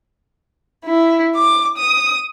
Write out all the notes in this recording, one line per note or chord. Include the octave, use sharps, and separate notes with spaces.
E4
D6
D#6